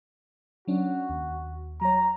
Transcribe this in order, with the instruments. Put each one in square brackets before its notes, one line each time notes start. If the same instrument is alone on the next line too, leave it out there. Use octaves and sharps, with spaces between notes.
[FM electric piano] F#3 C#4 D4 [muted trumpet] F#4
[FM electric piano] D#2
[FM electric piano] F#3 C#5 [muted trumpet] A#5